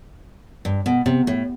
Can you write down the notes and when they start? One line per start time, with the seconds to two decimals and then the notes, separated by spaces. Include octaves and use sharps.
0.65 G2
0.86 B2
1.06 C3
1.27 A2